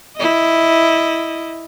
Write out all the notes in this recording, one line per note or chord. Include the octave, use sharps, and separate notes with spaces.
E4 D#5